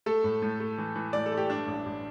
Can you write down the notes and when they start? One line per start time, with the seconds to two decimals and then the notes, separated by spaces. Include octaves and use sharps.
0.06 A3 A4
0.24 A2
0.42 A2
0.60 A3
0.78 E3
0.96 E3
1.13 A2 D5
1.26 A4
1.32 A3
1.37 G4
1.49 G2 D4
1.68 A1
1.86 A1